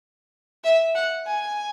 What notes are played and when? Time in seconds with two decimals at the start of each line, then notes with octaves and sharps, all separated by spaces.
0.64 E5
0.95 F#5
1.26 G#5